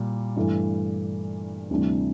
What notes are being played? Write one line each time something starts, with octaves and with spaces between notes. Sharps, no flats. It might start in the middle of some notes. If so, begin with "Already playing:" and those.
Already playing: A#2 G3
G2 E3 A3
D2 C3 E3 G3 D4